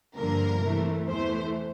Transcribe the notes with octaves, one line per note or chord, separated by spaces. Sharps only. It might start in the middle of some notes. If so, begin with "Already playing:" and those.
G2 D3 F3 A#3 A#4
C3 E3 A3
E2 E3 A3 C5